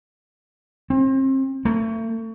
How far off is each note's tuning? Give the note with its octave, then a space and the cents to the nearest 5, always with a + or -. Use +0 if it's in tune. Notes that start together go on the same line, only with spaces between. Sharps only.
C4 +35
A3 +35